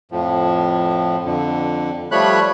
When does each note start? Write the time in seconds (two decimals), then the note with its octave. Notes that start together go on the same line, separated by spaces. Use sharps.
0.11 F2 A2 F3
1.25 F2 D3
2.11 F3 G3 A3 C#5 B5 F#6